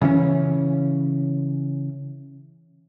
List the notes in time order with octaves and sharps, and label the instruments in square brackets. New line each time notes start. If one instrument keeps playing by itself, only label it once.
[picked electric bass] C#3 E3 C4 C#4